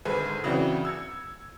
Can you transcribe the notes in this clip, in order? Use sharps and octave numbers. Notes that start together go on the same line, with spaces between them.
G#1 D3 G#4 B4
C#3 E3 F#3 C4 D4 F#4
E6 G#6 C#7